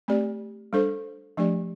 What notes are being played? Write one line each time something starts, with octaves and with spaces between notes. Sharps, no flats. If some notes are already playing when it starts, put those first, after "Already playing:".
A3 C4 G4 D5
G3 D4 A4 C5
F3 A3 D4 G4 D5